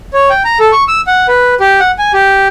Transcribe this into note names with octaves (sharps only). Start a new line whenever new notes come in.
C#5
G5
A#5
A4
C#6
E6
F#5
B4
G4
F#5
G#5
G4